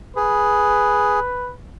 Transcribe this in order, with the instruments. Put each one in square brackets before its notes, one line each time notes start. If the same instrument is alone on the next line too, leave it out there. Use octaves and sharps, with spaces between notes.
[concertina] G#4 [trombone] B4